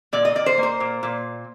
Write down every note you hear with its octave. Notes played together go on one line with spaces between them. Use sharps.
A#2 D5
D#5
A#2 D5
C5
A#3
C5
A#2
A#2